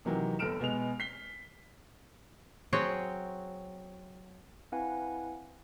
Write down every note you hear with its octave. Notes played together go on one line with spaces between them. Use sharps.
C3 D#3 E3 F#3 G4
G1 A4 B4 F6 D7 E7
B2 G#3 B3 F7
B6 C7 G7
F#3 C4 F#4 G#4 C#5 G5
C4 E4 B4 F5 F#5 G#5